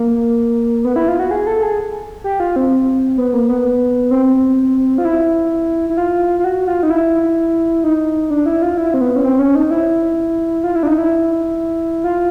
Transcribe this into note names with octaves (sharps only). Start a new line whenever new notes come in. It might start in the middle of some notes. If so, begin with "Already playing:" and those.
Already playing: A#3
B3
E4
F4
F#4
G#4
A4
G#4
G4
F4
C4
B3
A#3
B3
C4
F4
E4
E4
F4
F4
F#4
F4
D#4
E4
D#4
D4
E4
F4
E4
C4
B3
C#4
C4
C#4
D#4
E4
F4
E4
D4
D#4
E4
F4